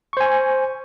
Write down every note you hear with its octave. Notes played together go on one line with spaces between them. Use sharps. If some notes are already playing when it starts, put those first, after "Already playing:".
C5 G#5 C#6